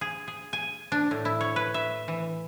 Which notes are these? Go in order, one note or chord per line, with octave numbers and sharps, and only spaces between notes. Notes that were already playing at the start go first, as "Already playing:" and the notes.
G#4
G#4
G#5
D4
A2
E4
C#5
B4
E5
E3